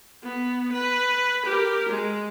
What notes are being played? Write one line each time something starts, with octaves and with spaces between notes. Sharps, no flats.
B3
B4
G4 A#4
G#3